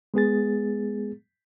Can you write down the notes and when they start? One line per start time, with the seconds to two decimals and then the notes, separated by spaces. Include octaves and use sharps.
0.14 G#3 B3 G#4 A6